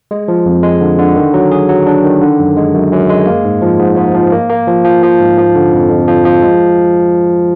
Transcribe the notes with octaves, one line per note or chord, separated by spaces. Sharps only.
G#3
F3
F2
G#3
D3
D3
D#3
F#3
G#4
F#3
D4
D#3
D3
F#2
G#3
F#2
F#2
G#3
A#3
G#2
F3
G#2
G#2
F3
A#3
A#3
F3
F3
F3
G#2
F3
D3
F2
F2
F3
F3
G#3